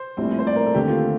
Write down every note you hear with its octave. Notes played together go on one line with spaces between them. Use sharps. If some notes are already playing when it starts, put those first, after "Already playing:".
Already playing: C5
A#1 A2 G3 C4
C5
D5
A#4
A4
D#2 D3 A3 C4 G4
F4